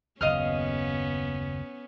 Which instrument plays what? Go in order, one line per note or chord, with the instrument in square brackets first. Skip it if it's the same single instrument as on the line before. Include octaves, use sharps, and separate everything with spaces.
[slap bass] F#1 D#2 [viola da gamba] B3 C#4 [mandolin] D#5 F5 F6